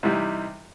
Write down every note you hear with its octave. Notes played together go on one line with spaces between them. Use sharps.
C3 E3 G3 D#4